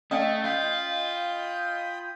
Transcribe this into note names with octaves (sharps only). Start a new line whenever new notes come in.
A3 C#4 D5 D#5 F5 G#5
F4 G5 B5 D#6